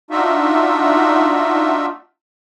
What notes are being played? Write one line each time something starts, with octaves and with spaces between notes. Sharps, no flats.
D4 D#4 F4 F#4 E5